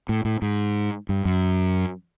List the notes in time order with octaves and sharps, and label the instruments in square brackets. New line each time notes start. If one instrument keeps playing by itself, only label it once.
[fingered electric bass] A2
A2
G#2
G2
F#2